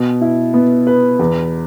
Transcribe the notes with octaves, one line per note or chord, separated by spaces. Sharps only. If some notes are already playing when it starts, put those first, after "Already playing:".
Already playing: B2
E4
B3
B4
E2